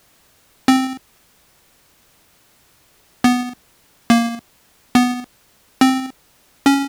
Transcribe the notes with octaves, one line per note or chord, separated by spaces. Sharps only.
C4
B3
A#3
B3
C4
C#4